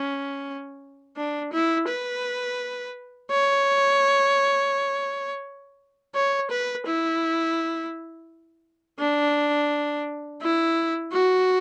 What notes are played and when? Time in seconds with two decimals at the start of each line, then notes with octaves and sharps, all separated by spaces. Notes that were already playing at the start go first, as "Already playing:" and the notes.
Already playing: C#4
1.17 D4
1.52 E4
1.88 B4
3.31 C#5
6.15 C#5
6.50 B4
6.86 E4
9.00 D4
10.42 E4
11.12 F#4